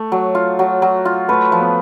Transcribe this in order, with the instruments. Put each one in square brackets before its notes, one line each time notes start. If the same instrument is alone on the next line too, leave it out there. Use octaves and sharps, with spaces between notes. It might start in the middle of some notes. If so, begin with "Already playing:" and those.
Already playing: [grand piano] A3
[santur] F#3
F4
F#3
F#3
F4
[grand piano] A3 [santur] B4
[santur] F3
[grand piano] B3